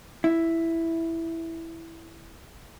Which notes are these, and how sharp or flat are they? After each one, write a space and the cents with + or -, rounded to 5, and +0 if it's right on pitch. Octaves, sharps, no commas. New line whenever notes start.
E4 +0